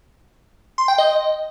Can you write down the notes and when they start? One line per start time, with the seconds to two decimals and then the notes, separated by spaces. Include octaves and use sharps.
0.78 C6
0.88 G5
0.98 D#5